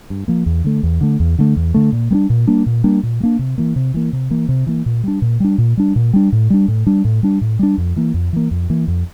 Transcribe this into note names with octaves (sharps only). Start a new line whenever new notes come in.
G2
F3 A#3
E2
D3 A3
E2
D3 A3
E2
D3 A3
E2
D3 A3
A#2
G3 A#3 D4
A#2
G3 A#3 D4
A#2
G3 A#3 D4
A#2
G3
A#3 D4
C3
E3 A#3
C3
E3 A#3
C3
E3 A#3
C3
E3 A#3
A#2
G3 D4
A#2
G3 D4
A#2
G3 D4
A#2
G3 D4
A2
G3 D4
A2
G3 D4
A2
G3 D4
A2
G3 D4
F2
E3 A#3
F2
E3 A#3
F2
E3 A#3
F2